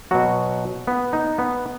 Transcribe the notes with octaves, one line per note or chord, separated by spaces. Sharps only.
B2 F#3 F#4
B3
D#4
B3